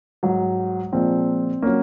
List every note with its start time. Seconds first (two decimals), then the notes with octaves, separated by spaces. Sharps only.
0.23 G#2 F#3
0.93 A#2 F3 G#3 C4
1.62 F#3 A#3 C#4